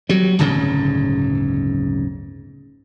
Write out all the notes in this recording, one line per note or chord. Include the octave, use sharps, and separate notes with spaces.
F#3 G3
D1 G1 G#2 C#3